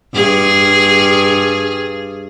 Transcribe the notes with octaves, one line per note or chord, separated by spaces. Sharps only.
G2 G#4